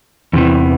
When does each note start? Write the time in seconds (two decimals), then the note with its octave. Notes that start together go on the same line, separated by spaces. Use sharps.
0.33 E2 C3 E3